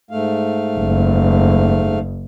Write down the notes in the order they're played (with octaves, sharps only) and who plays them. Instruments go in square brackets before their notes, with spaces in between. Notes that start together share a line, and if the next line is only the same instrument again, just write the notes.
[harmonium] G#2 A3 F5
[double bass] F#1